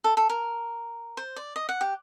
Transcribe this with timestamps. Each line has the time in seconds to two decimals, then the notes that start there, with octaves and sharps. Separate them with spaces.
0.04 A4
0.17 A4
0.29 A#4
1.17 C5
1.36 D5
1.56 D#5
1.69 F#5
1.81 G4